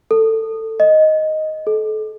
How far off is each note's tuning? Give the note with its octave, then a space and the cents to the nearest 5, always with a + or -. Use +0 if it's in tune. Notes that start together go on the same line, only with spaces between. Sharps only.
A4 +20
D#5 +0
A4 -35